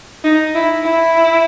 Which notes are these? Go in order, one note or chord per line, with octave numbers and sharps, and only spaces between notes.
D#4
E4
E4